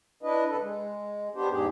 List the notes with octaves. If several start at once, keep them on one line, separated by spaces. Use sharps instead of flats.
D4 E4 B4 D#5
C#3 A4 B4
G#3
G3 B3 D4 G4 C5
E2 G#2 G4 G#4